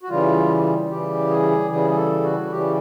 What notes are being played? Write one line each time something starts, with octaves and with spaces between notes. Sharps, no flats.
F#4
C#3 E3 G3 F4
C#3 E3 G3 G4
G#4
C#3 E3 G3 G#4
G#4
A4
F#4
C#3 E3 G3 G4